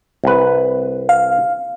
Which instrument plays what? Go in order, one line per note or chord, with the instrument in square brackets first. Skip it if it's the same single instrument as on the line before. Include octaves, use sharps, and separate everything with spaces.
[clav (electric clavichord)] C2 B4
[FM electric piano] F5